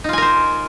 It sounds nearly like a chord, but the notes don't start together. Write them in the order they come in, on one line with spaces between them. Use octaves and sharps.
D#4 F4 G#5 A#4 C5